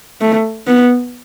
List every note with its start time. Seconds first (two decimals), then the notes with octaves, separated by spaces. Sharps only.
0.21 A3
0.67 B3